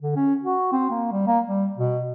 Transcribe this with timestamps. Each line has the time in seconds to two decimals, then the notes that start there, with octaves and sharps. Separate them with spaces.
0.02 D3
0.16 C#4
0.44 F#4
0.72 C4
0.90 A#3
1.12 G3
1.27 A#3
1.45 G3
1.78 B2